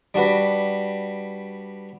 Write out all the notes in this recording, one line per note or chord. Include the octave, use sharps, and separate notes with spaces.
G3 D4 F#4 B4